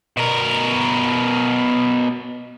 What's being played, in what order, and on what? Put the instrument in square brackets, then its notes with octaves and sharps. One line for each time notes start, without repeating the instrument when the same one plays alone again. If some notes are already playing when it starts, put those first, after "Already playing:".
[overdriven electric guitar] B2 A#4